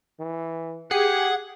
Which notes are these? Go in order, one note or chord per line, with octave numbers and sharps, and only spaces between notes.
E3
G4 G#4 F#5